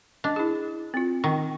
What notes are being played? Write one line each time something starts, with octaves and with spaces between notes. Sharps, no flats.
D4 D#5
E4 G#4
C4 F4
D#3 C#6